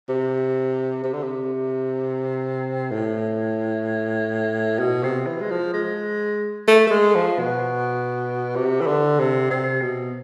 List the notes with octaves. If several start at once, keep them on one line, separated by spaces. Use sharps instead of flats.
C3
C3
D3
C3
A2
B2
C3
E3
G#3
F3
G#3
A3
A3
G#3
F3
B2
C3
E3
D3
C3
C3
B2